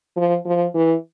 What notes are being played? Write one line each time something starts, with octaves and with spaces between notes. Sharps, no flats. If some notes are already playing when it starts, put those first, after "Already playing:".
F3
F3
E3